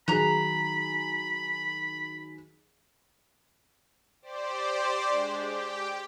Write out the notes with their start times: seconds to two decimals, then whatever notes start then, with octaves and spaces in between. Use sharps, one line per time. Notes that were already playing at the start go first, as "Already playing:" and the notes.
0.08 D#3 F#3 G#4 A#5 B5 F#6
4.22 G4 C5 D5
5.09 G#3 D4
5.39 G4 G5